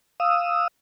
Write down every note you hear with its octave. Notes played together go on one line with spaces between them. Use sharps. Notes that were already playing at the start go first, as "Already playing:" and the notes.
F5 D#6 E6